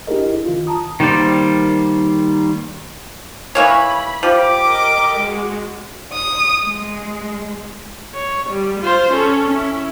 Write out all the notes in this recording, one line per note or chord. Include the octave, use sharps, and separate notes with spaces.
D4 E4 G4 G#4 A#4 D#5
D#3 F4
A5 A#5 D#6
D#3 G3 A#3 C5 D5
E3 A#3 C#5 B5
F3 G4 D6
A#4 D#5
G#3 F#4
D#6
G#3
C#5
G3
F4 C5
C#4 A4
C#4 E4